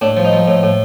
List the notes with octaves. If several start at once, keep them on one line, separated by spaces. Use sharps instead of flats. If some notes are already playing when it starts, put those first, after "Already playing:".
A2 D4
F3
D#4
F3
A2
A2